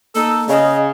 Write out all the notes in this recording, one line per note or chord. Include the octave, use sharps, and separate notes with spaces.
A#3 D#4 A4
C#3 D#5